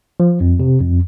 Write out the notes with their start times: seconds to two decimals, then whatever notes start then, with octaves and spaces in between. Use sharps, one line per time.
0.20 F3
0.40 F2
0.60 C3
0.81 F2